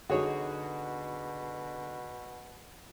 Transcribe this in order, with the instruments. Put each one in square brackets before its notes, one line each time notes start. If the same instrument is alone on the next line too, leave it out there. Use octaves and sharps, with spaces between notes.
[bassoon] B2 [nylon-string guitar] D3 D#4 [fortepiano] F#4 G#4 C#5